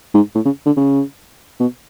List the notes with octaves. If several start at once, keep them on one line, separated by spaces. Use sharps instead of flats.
G#2
A2
C#3
D3
C#3
B2